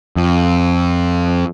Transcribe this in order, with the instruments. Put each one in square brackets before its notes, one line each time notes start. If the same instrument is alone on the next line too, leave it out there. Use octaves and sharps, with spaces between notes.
[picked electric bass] F2